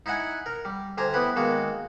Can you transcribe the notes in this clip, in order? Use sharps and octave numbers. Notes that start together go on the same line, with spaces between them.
D#4 E4 E5 F#5 G#5
A#4
G3
D2 G4 C5 G#5 A#5
B3 E4 G4 B4
D#3 G#3 A#3 F#4